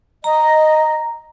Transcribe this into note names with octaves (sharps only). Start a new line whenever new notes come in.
D#5 A#5